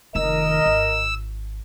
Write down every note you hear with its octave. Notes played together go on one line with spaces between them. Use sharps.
F1 D#3 A#4 D#5 E6
G#1